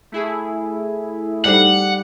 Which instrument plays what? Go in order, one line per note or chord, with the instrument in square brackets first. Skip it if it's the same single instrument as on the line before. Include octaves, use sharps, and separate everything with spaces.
[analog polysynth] A3 E4 G#4
[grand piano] G3 [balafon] D#4 A4 C5 [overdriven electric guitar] F#5